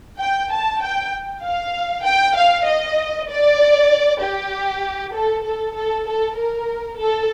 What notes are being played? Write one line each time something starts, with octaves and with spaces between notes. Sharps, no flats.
G5
A5
G5
F5
G5
F5
D#5
D5
G4
A4
A4
A4
A4
A#4
A4